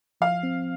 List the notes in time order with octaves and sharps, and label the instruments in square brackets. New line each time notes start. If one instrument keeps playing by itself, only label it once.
[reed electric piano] F3 [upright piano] F5
[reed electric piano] C4